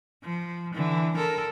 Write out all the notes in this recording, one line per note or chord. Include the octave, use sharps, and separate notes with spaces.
F3
D3 E3
A4 A#4